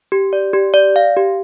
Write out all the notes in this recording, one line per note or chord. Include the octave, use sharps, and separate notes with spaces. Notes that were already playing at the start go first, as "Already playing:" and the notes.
G4
D5
G4
D5
F5
G4